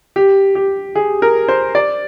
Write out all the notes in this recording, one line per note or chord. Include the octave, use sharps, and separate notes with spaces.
G4
G4
G#4
A#4
C5
D5